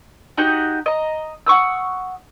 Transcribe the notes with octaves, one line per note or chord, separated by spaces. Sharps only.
D#4 F#4 G4 D#5
D#5 A#5
F#5 C#6 D#6 E6